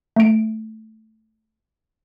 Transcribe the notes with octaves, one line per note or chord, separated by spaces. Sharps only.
A3 D7